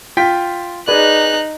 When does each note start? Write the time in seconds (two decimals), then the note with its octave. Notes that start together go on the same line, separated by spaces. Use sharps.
0.17 F4 G5 B6
0.88 D#4 G#4 B4 D5 F#6